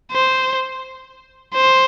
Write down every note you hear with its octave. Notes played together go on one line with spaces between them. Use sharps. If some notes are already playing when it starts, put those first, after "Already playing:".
C5
C5